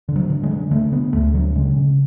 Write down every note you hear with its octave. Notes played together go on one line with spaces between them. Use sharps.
D3
F#3
D3
G#3
D3
D3 A3
D3 B3
D2 A3
D3 F#3
C#3 G#3
C#3